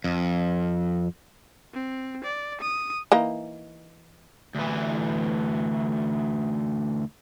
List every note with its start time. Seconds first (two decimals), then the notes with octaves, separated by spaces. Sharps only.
0.04 F2
1.73 C4
2.24 D5
2.61 D#6
3.12 E3 A#3 D#4
4.55 D2 E3